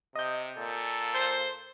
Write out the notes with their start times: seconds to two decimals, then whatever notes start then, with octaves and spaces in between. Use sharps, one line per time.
0.15 C3 D#5 G6
0.57 A#2 A4
1.15 C5 G6